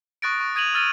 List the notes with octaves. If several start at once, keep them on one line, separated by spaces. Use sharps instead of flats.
C#6 D#6 F#6 A6 A#6 D7
C#6
D#6 G#6 D#7 F7 F#7
E6 F6 A6 D#7 F7